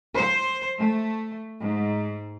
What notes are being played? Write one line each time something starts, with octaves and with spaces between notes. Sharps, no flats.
C5
A3
G#2